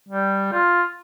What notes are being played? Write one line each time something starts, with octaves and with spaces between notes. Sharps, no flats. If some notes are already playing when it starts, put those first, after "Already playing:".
G3
F4